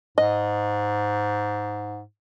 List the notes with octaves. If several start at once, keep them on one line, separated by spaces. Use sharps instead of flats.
G#2 D#5